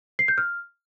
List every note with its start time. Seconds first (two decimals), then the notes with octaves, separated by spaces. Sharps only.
0.19 C7
0.28 G6
0.38 F6